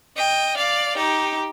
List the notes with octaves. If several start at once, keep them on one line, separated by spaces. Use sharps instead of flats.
D#5 G5
D5 F5
D#4 G4